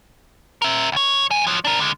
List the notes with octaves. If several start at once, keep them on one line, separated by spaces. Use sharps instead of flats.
A#4 E5
C#2 C#5
F2 G#5
F3 F#3
D4 A#4
D3 G#3